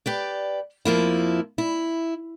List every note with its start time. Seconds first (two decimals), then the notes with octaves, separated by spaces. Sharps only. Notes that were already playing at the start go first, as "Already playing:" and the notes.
0.06 G4 B4 D5
0.85 F2 F3 A#3 E4
1.58 E4